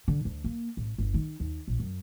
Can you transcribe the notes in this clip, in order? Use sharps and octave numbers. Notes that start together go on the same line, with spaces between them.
D3
D2
A#3
A1
G1
D#3
D#2
A#1
F#2